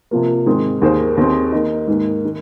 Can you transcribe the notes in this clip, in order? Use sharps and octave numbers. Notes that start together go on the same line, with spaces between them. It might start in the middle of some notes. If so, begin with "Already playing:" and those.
C3 F3 A#3
G#2 D#3 C4 G#4
D#2 D#3 A#3 G#4 C5
D#2 D#3 C4 G#4
D#3 A#3 D#4
G#2 D#3 A#3
D#3